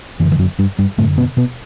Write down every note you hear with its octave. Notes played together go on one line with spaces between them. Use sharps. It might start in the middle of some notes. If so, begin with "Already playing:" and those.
F#2 D3 E3
E3
F#2 F#3
G2 G3
G2 G3
F#2 A2 D3 A3
B2 B3
B2 B3